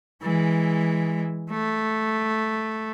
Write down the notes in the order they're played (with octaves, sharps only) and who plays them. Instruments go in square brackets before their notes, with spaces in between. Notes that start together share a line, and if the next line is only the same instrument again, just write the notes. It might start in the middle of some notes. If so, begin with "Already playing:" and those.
[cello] E3 G#3
A3